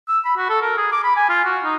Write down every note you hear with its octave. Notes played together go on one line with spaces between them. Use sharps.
E6
B5
F#4
A4
A#4
G#4
D6
B5
G#5
F4
F#4
D#4